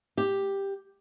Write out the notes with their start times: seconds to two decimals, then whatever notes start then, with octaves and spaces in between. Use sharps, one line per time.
0.17 G4